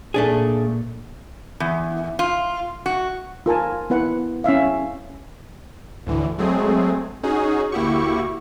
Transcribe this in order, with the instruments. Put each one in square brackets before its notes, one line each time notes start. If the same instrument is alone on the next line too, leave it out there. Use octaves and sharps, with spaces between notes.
[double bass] A#2 [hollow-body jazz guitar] A3 D4 G#4
[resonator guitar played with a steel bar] E2
F4
F#4
[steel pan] F4 A#4 G#5 A5
B3 E4 B4 F#5
C#4 E4 E5 F5
[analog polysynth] D2 A2 D3 E3
F#3 G#3 A3 C4 G#4
C#4 D#4 F#4 G#4
D2 A#3 E4 F#4 G4 C#6